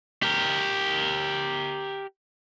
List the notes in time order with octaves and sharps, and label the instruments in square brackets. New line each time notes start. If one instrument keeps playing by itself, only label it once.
[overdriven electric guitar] G4 A#4